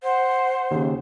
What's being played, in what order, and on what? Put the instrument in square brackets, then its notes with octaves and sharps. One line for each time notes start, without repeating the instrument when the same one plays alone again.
[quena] C5 [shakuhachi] F#5
[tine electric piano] D#2 C#3